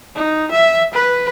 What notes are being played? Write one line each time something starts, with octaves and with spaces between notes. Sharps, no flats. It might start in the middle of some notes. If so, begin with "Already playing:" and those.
D#4
E5
B4